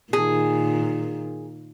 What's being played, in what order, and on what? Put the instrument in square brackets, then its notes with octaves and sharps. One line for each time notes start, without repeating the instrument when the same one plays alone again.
[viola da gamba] A#2 D#3 [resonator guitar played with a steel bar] G#4